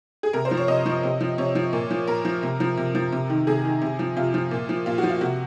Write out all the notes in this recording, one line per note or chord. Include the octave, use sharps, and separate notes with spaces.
G#4
C3 A#4
C5
F3
C#5
C3 D#5
F3
C3
F3
C3 C#5
F3
A#2
F3
A#2 A#4
F3
C3
F3
C3
F3
C3
D#3
C3 G#4
D#3
C3
F3
C3 F4
F3
A#2
F3
A#2 F4
F#4
F3
F4
C3 F#4